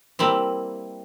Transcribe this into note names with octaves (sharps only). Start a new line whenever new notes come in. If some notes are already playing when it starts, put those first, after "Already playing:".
G3 A#3 C4 E4